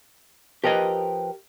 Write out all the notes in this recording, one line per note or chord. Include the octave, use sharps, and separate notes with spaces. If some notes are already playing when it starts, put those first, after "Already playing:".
F3 G4 A#4 B4 D#5 G5